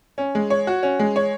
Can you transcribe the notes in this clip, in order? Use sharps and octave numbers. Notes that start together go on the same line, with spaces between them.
C#4
G#3
C#5
F#4
C#4
G#3
C#5